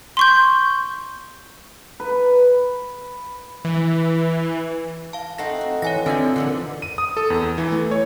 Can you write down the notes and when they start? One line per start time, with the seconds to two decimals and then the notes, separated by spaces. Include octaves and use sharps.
0.17 C6 C#6 G6
2.00 B4
3.65 E3
5.13 F5 A5
5.38 A3 C4 D#4 F5 F#5 A#6
5.61 F#4
5.82 E3 C#5 G#5 A#6
6.06 D3 C4 F4 D#5 E5 G#5 A5
6.36 A#2 D3 E3 F3 F#5
6.82 D#7
6.98 D#6
7.17 A4
7.30 E2
7.58 E3
7.72 A3
7.91 C#5